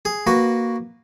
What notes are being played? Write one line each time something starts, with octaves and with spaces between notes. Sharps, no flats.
G#4
A#3 F#4 B4